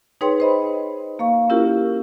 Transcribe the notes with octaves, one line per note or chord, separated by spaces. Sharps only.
D#4 G#4 B4 C#5 G5 C6
G#4 C5 D#5 B5
A#3 F5 C#6
C#4 E4 F4 G4 A#4